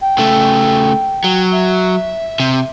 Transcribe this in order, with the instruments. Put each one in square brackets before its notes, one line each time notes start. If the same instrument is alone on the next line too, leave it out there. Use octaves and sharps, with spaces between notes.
[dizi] G5
[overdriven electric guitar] C#3 A3
F#3
[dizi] E5
[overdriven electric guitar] C3